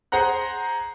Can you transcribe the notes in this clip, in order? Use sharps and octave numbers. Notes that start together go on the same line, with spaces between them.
G#4 C5 F#5 A#5 F#6